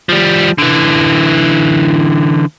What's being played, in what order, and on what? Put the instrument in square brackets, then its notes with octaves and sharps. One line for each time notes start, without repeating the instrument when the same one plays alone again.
[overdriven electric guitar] F3 G3
D3 E3